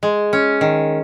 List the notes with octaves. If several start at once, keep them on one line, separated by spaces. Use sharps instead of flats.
G#3
C#4
D#3